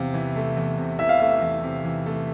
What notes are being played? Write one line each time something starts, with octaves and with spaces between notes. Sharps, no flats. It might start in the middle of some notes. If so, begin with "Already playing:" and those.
Already playing: E2 C3 F5
E3
A3
E2
C3
E3 E5
F5
A3 E5
E2
C3
E3
A3